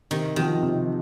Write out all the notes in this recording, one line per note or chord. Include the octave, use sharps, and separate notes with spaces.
C3 D#3
D#3 F3 C4 F#4
C3